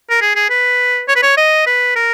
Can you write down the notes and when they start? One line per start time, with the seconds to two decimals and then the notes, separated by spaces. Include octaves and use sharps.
0.10 A#4
0.21 G#4
0.36 G#4
0.50 B4
1.08 C#5
1.16 B4
1.23 C#5
1.37 D#5
1.67 B4
1.96 A#4